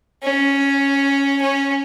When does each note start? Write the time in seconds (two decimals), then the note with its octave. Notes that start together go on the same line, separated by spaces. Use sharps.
0.23 C#4
1.41 C#4